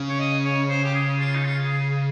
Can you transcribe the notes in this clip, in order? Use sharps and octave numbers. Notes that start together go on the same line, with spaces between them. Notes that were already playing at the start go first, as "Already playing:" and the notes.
Already playing: C#3
C#5
D#5
C#5
C5
G4
G#4
F4
D#4
F4
G#4